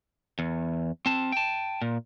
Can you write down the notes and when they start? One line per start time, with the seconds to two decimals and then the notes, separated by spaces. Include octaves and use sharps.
0.39 E2
1.06 C4 A5
1.32 G5 A5
1.82 A#2